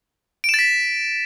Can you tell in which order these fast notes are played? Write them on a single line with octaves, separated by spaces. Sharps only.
D7 E7 A6 B6